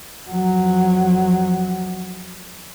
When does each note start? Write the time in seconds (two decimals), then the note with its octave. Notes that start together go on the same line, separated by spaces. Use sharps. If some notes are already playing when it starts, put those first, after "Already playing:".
0.29 F2 F#3